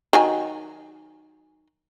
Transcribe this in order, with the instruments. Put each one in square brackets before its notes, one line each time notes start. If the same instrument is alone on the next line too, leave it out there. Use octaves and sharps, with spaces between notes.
[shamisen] D#3 F#3 G#5